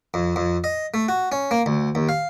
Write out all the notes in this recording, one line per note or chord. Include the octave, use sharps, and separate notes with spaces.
F2
F2
D#5
A3
F#4
C#4
A#3
D2
D#2
F5